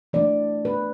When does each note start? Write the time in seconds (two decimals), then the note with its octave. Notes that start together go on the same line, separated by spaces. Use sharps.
0.13 E3 A3 D4 D5
0.65 B4